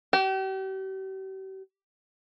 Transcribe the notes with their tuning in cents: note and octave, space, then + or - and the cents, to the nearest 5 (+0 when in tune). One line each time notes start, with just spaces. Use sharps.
G4 -40